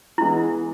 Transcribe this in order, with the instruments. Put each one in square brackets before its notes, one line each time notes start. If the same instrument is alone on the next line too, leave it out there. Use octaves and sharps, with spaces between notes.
[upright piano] E3 G#3 B3 [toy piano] E4